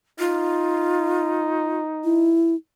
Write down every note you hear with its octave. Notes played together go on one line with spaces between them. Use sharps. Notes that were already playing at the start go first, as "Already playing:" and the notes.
D#4 F4
E4